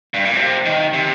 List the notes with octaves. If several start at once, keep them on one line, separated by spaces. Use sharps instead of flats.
G2
A#2
C3
D#3
C3